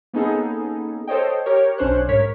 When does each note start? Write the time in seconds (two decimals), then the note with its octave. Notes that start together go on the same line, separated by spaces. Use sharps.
0.13 A#3 B3 C#4 D#4 G#4 A4
1.07 A4 C5 C#5 D#5 G5
1.46 G4 A#4 C#5
1.78 B1 C#4 D4 C5 C#5 F#6
2.09 G#2 A#4 C#5 B6